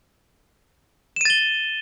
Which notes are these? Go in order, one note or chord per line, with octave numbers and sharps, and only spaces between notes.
A6 D#7 E7 G7